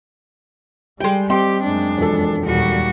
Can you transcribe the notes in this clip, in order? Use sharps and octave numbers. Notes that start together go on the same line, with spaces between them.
G3 G#3 G4 G5
C4 G4 D#5 G5 C6
F#2 G#3 D4
E1 F2 A4
D#2 A#2 G3 F#4